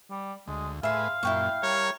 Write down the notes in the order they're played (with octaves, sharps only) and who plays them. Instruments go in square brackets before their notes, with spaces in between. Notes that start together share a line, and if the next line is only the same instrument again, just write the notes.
[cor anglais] G3
[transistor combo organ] D2 [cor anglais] G#3
[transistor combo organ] A2 G#4 B4 [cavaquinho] E5 C6 [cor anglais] F5
[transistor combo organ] F#2 A#2 [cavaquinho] E4 G5 C#6
[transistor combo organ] G3 A#4 [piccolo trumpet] C#5